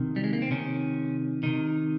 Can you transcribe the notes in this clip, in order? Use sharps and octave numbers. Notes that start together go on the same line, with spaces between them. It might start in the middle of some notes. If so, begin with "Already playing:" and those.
Already playing: C3 D#3
G3
G#3
A#3
C4
C3 D#3 C#4
C3 D#3 D#4